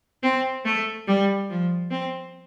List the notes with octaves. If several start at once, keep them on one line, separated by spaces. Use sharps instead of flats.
C4
A3
G3
F3
C4